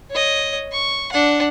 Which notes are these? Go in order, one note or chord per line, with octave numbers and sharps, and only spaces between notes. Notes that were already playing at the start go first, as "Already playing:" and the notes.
C#5 D#5
C#6
D4 F#5